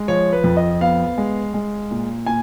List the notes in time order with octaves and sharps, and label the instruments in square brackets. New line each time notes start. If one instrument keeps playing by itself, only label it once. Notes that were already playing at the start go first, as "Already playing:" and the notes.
Already playing: [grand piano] G#3
F3 C#5
B4
F2
D#5
B3 F5
G#3
G#3
A#2
A#2 G#5